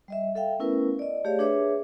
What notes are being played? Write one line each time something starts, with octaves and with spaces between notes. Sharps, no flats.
G3 D#5 E5
A4 E5 F5 G5
A3 B3 C#4 E4 A#4 B4
D5 D#5
A3 G4 G#4 C#5 D5 F5
D4 G#4 B4 C#5 E5 D6